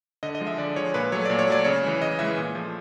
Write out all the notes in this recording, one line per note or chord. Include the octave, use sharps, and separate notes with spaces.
D3 D#5
D#5
F3 G#3
E5
D3 D5
F3 G#3 C#5
A#2 B4
F#3 A3 C#5
A#2 D5
C#5
F#3 A3 D5
C#3 C#5
E3 G#3
C#3 D#5
E3 G#3 E5
A#2
F3 A3